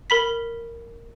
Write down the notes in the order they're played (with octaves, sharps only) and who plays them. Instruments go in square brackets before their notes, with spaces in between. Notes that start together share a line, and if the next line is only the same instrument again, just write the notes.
[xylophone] A#4 B5 B6